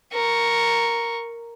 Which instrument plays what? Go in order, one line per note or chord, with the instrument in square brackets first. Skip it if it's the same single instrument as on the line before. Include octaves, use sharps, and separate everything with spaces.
[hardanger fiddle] A#4 C#6